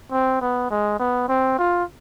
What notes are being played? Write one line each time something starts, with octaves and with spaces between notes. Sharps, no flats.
C4
B3
G#3
B3
C4
F4